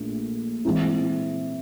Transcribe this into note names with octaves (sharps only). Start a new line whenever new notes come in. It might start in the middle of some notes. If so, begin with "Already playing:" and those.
Already playing: A#1 A#2 A3
E3 G#3 C4 E4